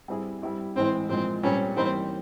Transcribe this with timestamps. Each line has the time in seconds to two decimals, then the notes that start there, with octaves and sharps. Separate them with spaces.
0.08 G3 C4 E4 G#4
0.42 G3 C4 E4 G4
0.76 A2 E3 G#3 C4
1.09 A#2 F3 G#3 C4
1.43 A#2 G3 C4 C#4
1.76 E3 G3 A#3 C4 D#4